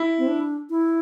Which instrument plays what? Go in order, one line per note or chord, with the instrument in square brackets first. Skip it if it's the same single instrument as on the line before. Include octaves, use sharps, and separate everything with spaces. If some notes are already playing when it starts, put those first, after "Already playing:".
Already playing: [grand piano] E4
[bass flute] C4
D4
E4